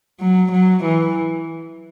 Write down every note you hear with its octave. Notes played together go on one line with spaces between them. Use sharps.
F#3
F#3
E3